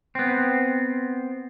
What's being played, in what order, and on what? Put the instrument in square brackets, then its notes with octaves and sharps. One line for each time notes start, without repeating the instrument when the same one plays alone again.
[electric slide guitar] B3 C4